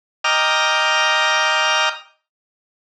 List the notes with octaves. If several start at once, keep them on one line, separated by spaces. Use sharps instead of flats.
D#5 G5 A#5 D6 F6